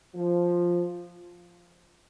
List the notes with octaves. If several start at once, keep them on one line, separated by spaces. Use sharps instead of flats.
F3